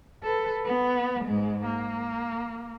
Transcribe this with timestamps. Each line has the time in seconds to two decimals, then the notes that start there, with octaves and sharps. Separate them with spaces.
0.23 A4 B4
0.65 B3
1.24 G#2 G#3
1.66 A#3